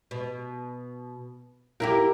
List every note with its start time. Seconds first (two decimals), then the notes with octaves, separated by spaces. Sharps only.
0.11 B2
1.80 A#3 E4 G4 A#4